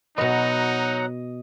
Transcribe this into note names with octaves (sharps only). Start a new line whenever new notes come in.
B2 F#3 B3 D#4 D#5 F#5 A#5